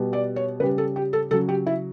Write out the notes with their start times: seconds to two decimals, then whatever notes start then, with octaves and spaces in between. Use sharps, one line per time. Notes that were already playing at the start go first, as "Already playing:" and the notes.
Already playing: B2 G3
0.13 D5
0.36 C#5
0.60 C#3 G3 B4
0.78 A4
0.96 G4
1.13 A4
1.31 C#3 F#3 A4
1.48 G4
1.66 E4